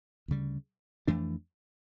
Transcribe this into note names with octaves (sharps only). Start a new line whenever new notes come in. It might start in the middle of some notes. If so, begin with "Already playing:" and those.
D2 C#3 G3
F2 E3 A3 D4